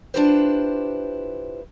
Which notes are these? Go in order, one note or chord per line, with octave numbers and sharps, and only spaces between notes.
D4 E4 F4 G4 B4 C5